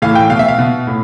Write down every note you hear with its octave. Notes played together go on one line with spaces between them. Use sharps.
A2 E3 F5
G5
B2 F5
E5
F5
B2
A2